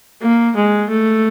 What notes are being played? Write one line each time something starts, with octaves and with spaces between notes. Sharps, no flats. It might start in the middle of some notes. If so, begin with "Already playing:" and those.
A#3
G#3
A3